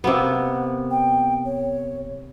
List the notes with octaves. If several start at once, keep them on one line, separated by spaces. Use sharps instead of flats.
C3 A#3 B3 F#5
G5
C#5